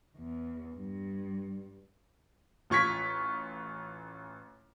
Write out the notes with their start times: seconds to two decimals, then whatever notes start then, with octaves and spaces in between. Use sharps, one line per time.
0.17 E2
0.75 G2
2.70 A1 F4 C#6 G#6 B6